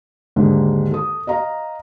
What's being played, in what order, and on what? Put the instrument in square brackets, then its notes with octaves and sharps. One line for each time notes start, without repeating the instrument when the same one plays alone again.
[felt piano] D#2 G#2 D3 D#3
A4 D#6
D#5 F5 A#5